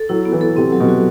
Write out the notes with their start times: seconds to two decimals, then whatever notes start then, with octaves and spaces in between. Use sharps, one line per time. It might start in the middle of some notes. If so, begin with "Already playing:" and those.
Already playing: A4
0.09 F#3 E4
0.25 B3
0.32 E3
0.41 A4
0.57 C3 C4
0.73 F#3
0.80 B2
0.88 F#4